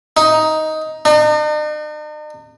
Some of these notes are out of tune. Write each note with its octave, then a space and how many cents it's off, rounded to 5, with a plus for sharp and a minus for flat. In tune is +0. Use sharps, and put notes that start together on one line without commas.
D#4 +10
D#4 -45